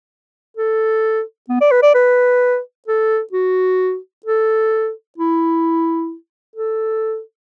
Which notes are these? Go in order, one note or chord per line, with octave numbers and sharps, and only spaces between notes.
A4
B3
D5
B4
D5
B4
A4
F#4
A4
E4
A4